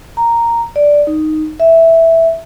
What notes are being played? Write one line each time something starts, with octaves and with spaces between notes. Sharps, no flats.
A#5
D5
D#4
E5